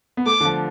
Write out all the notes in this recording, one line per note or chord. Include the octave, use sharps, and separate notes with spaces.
B3
A3 D6
D3
F3